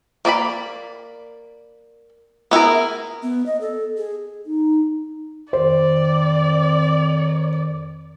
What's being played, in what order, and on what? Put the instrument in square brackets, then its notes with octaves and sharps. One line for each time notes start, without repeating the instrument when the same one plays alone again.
[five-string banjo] A#3 D5 D#5 B5
B3 E4 G#4 A#4
[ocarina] B3
D#5
A4
G#4
[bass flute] D#4
[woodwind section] F2 D#3 [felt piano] C5 [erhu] D5